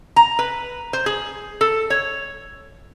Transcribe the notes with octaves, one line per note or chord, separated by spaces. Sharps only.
A#5
B4
C5
G#4
A4
C#5